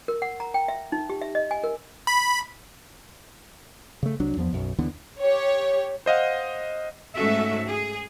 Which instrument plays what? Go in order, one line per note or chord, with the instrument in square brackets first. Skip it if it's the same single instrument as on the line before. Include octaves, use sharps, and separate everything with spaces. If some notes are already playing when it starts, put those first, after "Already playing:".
[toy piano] A#4
F#5
A#5
G5
E5
D#4
G4
E5
D#5
G#5
A#4
[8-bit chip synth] B5
[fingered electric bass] C#3 A3
C2 F#3 D4
E2 F3 B3
B1 F#2
D#2 D3 E3 B3
[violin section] G4 C#5
[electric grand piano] C5 D#5 F5 F#5
[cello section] G#2 A3 C#4 F#4 A4 E5
G#4